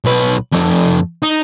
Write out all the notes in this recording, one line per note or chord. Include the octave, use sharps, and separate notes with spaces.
B1 B4
F2 A3
D#4